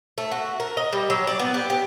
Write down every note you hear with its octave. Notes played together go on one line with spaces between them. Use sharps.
A3
F#4
A#4
D#5
G3
F#3
D5
B3
G4
G4